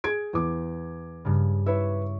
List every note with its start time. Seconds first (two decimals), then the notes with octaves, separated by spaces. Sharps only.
0.04 G#4 G#6 D7
0.33 E2 D6
1.25 G2 C#3
1.66 E4 B4 C#5 E5